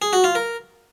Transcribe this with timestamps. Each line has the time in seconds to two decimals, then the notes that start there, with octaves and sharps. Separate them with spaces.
0.02 G#4
0.13 F#4
0.24 F4
0.35 A#4